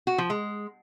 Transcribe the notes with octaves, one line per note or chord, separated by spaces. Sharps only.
F#4
F3
G#3